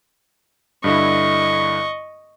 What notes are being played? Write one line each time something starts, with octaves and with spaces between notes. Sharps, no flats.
G2 D3 E4 D#5 C#6